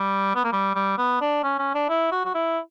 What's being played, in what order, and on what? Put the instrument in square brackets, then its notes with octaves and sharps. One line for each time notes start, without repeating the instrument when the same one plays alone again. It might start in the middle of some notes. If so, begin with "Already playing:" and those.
Already playing: [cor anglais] G3
B3
A#3
G3
G3
B3
D4
C#4
C#4
D4
E4
F#4
F#4
E4